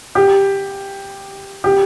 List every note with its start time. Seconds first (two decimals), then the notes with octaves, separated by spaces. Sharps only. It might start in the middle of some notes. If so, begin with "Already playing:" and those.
0.15 G4
1.64 G4